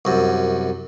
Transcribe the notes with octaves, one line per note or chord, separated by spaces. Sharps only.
C2 F#2